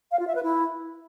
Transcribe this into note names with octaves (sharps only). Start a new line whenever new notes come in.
F5
F4
E5
B4
E4